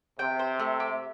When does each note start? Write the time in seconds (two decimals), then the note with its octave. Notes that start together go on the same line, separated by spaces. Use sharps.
0.19 C3 G5
0.39 C5
0.59 A3
0.80 G4